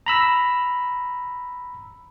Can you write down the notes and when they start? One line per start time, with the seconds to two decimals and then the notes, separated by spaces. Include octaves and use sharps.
0.06 A#5 B5 E6